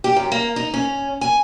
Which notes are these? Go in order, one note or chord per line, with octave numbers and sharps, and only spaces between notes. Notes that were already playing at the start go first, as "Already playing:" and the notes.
G4
F#2
A#3
D#4
C#4
G#5